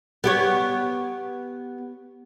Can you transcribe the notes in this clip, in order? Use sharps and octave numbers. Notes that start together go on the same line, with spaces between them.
B3 G4 C#5